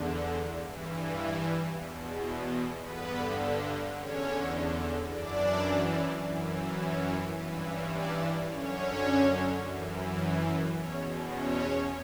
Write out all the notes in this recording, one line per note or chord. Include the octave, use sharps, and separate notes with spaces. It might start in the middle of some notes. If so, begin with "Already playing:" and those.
Already playing: E2 D3
G2 E3
E2 B2
G2 D3 B3 B4
E2 D3 C#4 C#5
F#2 E3 D4 D5
F#2 E3
C#4 C#5
G2 E3 B3 B4
C#4 C#5
D4 D5
F#2 D3 C#4 C#5
F#2 E3
E2 B2 C#4 C#5
C#4 C#5